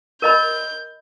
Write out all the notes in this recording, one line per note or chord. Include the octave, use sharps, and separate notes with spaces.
A#4 D#5 B5 G6